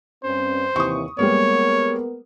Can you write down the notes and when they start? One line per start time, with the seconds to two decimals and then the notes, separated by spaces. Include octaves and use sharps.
0.24 G2 C4 C#4 C5
0.76 D#2 C3 E3 C#6 D#6
1.19 G3 G#3 A#3 B3 A#4 C#5